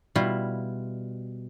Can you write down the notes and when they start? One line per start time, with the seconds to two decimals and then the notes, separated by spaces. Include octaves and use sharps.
0.15 B2 G3 E4 F4